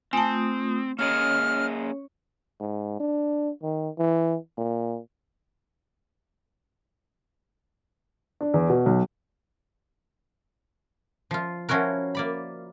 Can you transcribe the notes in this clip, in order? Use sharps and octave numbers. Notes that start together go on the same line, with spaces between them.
A3 C4 F4 G#5 A5 D#6
A#3 C#4 G#4 C#5 D#5 F6
G#2
D4
D#3
E3
A#2
D4
E2
B2
B1
F3 F4
F3 C#4 E4 F#4 A#4
A#3 D5 B5